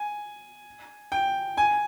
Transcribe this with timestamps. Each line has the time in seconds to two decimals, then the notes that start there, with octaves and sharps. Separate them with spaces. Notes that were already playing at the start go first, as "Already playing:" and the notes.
Already playing: G#5
1.12 G5
1.57 G#5